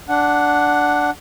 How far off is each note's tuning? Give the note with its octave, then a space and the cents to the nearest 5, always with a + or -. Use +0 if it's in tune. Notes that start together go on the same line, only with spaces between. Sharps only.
D4 -5 F#5 +0